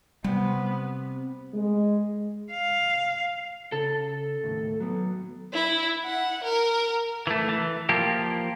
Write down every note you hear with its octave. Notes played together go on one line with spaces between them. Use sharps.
C3 G3 B3
G#3
F5
C#3 A4
D#2 A2
F#3 B3
E4
F#5
A#4
E3 A3
E3
F3 A#3 G4